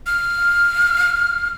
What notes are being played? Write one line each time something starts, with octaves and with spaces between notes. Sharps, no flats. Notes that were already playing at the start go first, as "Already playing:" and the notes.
F6